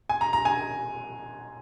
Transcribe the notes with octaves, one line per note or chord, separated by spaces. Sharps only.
G#5
A#5
A#5
G#5